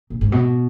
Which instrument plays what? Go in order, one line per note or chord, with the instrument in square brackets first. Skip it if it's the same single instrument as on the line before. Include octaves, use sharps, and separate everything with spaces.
[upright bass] A#2
G#2
B2